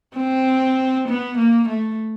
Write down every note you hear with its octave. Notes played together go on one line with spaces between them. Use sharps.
C4
B3
A#3
A3